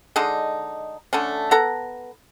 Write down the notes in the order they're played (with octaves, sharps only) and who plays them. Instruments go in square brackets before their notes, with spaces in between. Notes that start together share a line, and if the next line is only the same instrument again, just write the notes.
[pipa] D3 G#3 D4 D#4
D3 A3 C#4
B3 A4 A#5